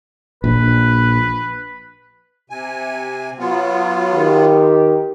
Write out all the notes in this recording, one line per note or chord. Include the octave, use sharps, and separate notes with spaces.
A#1 B4
C3 G#5
F#3 B3 F4
D#3 G4